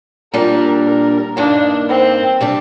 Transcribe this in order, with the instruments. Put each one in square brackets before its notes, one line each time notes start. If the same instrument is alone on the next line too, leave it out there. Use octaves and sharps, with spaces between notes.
[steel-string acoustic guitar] A#2 G3 D4 [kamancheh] A#4
[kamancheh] A#4
[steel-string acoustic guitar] G2 D#3 A#3 [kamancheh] D4
[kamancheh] C4
[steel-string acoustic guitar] C3 G3 D4